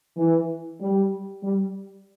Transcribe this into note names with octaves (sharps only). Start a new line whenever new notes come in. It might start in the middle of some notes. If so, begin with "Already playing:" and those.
E3
G3
G3